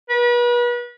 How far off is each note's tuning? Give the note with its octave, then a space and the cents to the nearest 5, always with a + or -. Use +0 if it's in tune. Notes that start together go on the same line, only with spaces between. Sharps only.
B4 -35